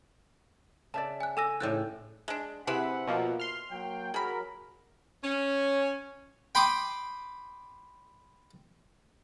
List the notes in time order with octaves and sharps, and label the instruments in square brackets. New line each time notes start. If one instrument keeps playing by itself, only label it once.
[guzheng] C#3 [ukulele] D5 E5 A5
[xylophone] G#5 F#6
[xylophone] A4 E6 A#6 [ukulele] G#5
[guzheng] A2 C#3 A5 [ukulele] E4 C5 D5 [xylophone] F#6
[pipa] G#3 D4
[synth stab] C3 [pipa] E4 G#4 B4 [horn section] C5 E5 F#5
[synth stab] B2 F3 A#3
C6 F6
[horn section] F#3 A#3 G5
[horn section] F#3 A#4 [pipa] G#4 B5
[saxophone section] C#4
[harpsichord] G5 B5 C6 D6 D#6